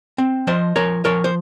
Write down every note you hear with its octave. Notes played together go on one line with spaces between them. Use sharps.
C4
F3 C5 D#5
F3 A#4 C#5
F3 A#4 C#5
C5